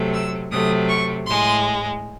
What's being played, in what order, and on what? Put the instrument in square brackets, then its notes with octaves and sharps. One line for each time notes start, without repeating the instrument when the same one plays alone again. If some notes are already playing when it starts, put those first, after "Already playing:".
Already playing: [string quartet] C3 F#3 A3
E6
C3 F#3 A3 D#6
C#6
A2 G#3 C6